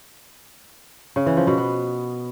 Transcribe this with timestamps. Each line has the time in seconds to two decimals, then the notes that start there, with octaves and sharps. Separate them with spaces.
1.16 C#3
1.26 E3
1.37 F3
1.47 B2
1.58 B3